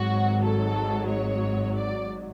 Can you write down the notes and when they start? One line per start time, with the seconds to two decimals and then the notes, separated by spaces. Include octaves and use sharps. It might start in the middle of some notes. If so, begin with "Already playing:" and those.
Already playing: G#1 G#2 F#3 F#4
0.43 A4
1.10 C#5
1.76 D5